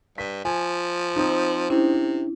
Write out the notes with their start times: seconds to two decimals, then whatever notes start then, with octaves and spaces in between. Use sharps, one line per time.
0.18 G2 B6
0.45 F3 G#5
1.16 C4 D#4
1.70 C3 C#4 D4 E4